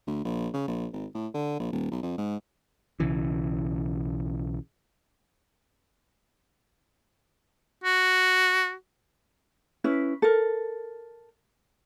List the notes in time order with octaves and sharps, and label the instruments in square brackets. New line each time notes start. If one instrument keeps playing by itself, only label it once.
[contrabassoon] D2
A#1
C#3
A#1
G#1
A2
D3
A#1
D#1
B1
F2
G#2
[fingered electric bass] B1 C#3 E3
[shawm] F#4
[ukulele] C#4 E4 B4
A4 A#4